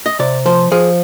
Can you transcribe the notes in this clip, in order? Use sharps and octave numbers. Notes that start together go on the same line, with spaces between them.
D#5
C3 D5
F3 C5
F3 G#4